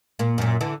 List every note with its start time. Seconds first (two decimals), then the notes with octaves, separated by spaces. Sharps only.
0.19 A#2 A#3
0.38 F#2 A#2
0.61 D3 E3